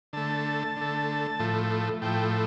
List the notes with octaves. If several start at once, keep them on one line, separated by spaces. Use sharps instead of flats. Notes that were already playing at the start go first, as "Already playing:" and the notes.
D3 A3 A5
D3 A3
A2 F3 A3
A2 F3 A3 G5